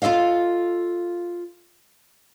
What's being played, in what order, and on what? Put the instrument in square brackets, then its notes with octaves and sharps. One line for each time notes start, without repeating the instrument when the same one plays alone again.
[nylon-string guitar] F4 F#4 A4 D#5 F5